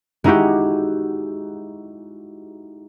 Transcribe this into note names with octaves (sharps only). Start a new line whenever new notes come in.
G#3 D#4 E4 F#4 G4